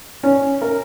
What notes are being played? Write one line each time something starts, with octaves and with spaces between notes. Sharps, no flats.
C#4
A#4